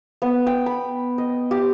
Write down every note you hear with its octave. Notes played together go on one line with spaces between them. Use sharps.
B3
G5
B5
D#5
G4